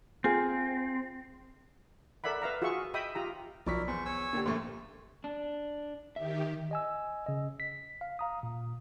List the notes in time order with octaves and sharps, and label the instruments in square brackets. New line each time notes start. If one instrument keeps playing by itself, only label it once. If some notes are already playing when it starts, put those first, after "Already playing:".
[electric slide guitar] C4 [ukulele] F4 G#4
[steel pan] A4 A#4 D5 E5 F#5 B5
B4 E5 F5 A#5
F4 F#4 G#4 E5 C#6
D#5 E5 G5 B5 D#6
F4 G4 A#5
[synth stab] B1 [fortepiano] F3 [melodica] E4 A#4 [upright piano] D5 C#6 B6
[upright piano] E2 [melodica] C5 C#6
[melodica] C#5 G#5 E6
[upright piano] D3 [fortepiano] A#3 D4 G4
[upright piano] A#1 A#2 A3 [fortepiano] C6 C#6
[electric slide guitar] D4
[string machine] D#3 G4 [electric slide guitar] E5
[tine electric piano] D#5 G#5 E6
C#3 D#5
B6
F5
F5 A#5 D#6
A#2